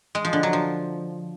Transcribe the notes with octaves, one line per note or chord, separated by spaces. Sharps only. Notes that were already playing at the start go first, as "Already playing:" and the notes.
G#3
F3
D3
F#3
F3